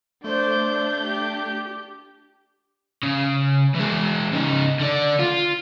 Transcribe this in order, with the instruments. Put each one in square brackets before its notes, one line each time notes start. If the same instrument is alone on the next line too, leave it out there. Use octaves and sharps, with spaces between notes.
[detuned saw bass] A3 [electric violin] D4 G6 [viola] C5 D5
[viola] G4
[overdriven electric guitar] C#3
E3 G#3
C#3 D#4
D3 D5
F4